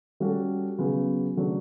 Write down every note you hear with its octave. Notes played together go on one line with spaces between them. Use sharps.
G3 C#4 F#4 A4
C#3 F#3 B3
C#3 F#3 A3 D4